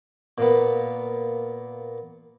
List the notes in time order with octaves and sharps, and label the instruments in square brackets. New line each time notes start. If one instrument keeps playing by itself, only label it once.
[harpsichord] A#2 A#3 B3